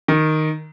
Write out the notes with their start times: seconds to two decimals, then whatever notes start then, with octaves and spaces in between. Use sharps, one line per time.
0.08 D#3